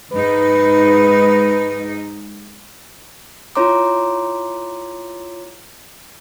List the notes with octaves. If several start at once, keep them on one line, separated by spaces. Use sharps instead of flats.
G#2 D#4 B4
E4 F4 C#5 A#5 C6 D6